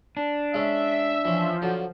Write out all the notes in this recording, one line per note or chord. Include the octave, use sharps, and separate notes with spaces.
D4
G#3 C#4 E5
E3 F3 C#4
D3 F#3